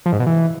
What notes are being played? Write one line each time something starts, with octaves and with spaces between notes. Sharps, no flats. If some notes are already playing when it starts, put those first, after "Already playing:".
F3
G#2
B2
E3